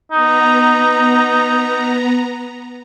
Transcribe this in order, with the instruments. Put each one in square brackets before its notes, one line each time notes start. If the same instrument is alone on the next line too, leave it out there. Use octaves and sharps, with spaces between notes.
[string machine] B3 A#5 [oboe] D#4